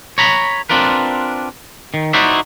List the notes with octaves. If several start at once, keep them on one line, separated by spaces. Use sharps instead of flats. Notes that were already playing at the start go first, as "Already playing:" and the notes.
C#5 A#5 B5
C4 D4 F4 A#4 B4
D#3
D#4 E4 F#4 C5 D5 E5